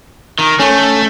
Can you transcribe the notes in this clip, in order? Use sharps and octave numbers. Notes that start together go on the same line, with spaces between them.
D#3
A3 C#4